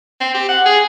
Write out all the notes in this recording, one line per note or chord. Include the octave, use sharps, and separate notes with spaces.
C4
G4
F#5
G#4